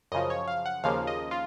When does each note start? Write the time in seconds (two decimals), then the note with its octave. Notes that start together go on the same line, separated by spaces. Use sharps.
0.12 F#2 C#3 F3 D#5
0.30 C#5
0.47 F5
0.66 F#5
0.83 D#2 C#3 F3 A#3 F5
1.07 D#5
1.31 F4